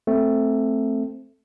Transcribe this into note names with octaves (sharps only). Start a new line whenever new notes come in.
A3 C4